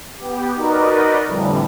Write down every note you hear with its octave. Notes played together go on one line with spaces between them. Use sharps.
B3 G4
D#4 F#4 A#4 B4 D5 D#5
F2 A2 D3 E3 G3